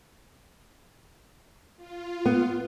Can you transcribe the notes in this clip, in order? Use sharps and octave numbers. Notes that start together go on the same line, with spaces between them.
F4
B3